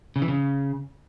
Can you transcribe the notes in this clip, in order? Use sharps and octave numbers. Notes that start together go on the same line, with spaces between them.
C#3
E3
C#3